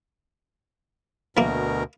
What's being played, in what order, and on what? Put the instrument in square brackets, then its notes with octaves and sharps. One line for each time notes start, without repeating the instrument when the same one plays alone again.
[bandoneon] D2 B2 A#4 [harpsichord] E3 A#3